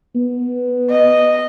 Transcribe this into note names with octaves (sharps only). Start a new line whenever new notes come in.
B3
D#5